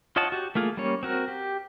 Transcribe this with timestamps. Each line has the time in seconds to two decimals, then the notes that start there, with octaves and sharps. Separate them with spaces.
0.16 F4 C#5 D#5 F#5 A5
0.32 F#4 G4
0.55 A3 A#3 F4 G#4
0.77 G3 A#3 C#4 C#5
1.03 C4 F#4 A#4
1.28 G4